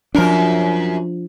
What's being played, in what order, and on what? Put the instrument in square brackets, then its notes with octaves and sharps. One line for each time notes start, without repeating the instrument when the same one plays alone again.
[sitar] F#2 A#4 [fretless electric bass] F3 D4